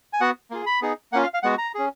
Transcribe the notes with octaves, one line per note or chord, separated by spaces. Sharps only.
G#5
B3 F#4 F#5
A#3 F4 G#4
B5
B3 D#4 G#4
A#3 C#4 F4 F#5
F5
F5
G#3 B3 F#4 F#5
A#5
C#4 G#4